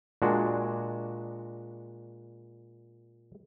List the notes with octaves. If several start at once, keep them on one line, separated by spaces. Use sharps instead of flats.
A#2 G#3 D4 F#4